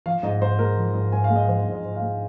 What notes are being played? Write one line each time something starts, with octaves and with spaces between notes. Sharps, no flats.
F3 F5
G#2 D#5
G#2 C5
G#3 A#4
F3
G#2
G#2 G#5
F5
G#3
D#5
F3 C5
G#2
D#5
G#2
F5
G#3